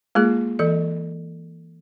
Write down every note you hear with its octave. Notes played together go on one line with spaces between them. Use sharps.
G#3 A#3 F4 G#4
E3 A4 D#5